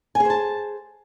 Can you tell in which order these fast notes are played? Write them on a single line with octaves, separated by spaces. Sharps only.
G#5 G#4 C5 A5